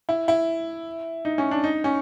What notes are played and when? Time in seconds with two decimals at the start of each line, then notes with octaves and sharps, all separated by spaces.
0.09 E4
0.28 E4
1.25 D#4
1.38 C#4
1.51 D4
1.64 D#4
1.84 C#4